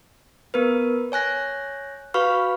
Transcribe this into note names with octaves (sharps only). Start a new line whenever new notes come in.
B3 A#4 B4
C#5 G#5 F#6 A#6
F#4 B4 F5 B5 C#6 F6